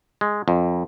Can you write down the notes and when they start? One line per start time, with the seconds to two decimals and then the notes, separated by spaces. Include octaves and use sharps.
0.21 G#3
0.48 F2